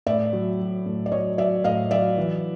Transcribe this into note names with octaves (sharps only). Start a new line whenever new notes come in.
A2 D5 E5
F#3
F#3
A2
D5
F#3 C#5 D#5
F#3 D5 E5
A2 D#5 F5
F#3 D5 E5
E3